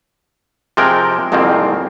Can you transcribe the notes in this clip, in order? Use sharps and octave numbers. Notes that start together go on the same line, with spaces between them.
C3 F3 G#3 A#4 G5
C2 F2 G#2 D#3 A#3 C4